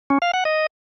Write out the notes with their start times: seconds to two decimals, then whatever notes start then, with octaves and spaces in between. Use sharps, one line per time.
0.10 C#4
0.22 F5
0.34 F#5
0.45 D#5